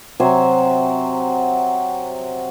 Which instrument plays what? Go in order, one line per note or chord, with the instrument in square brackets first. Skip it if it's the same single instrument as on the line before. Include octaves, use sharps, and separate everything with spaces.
[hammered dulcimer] C3 F#3 C5 G#5